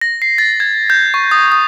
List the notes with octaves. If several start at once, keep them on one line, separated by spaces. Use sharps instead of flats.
A#6
C7
A6
G#6
G6
C#6
D#6
D#6